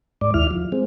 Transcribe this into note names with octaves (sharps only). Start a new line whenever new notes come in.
G#2 D5
D#2 E4 F6
F3
G#3 C4